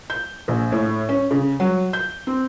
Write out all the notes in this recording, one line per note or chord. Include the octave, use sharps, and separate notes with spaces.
G6
A#1
A2
C#4
C#3
F#3
G6
C4